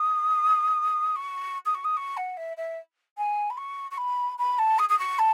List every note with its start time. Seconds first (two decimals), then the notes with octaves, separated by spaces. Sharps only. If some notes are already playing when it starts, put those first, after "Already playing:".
Already playing: D#6
1.16 C#6
1.65 D#6
1.74 C#6
1.84 D#6
1.97 C#6
2.17 F#5
2.37 E5
2.57 E5
3.17 G#5
3.50 B5
3.57 C#6
3.91 C#6
3.97 B5
4.38 B5
4.58 A5
4.79 D#6
4.89 D#6
4.99 C#6
5.18 A5